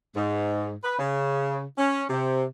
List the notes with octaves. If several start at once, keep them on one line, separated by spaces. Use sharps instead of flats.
G#2
B4
C#3
C#4
C3